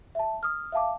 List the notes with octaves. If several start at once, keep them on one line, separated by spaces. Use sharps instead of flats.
E5 A5
D#6 F6
E5 F5 A5 D6